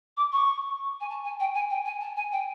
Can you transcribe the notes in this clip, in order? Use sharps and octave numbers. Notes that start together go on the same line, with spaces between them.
D6
C#6
G#5
A5
G#5
G5
G#5
G5
G#5
A5
G#5
G5